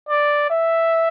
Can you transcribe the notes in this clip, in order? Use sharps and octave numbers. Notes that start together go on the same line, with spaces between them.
D5
E5